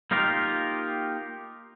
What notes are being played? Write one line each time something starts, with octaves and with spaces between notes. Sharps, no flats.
A#3 D#4 F4 G4 A#4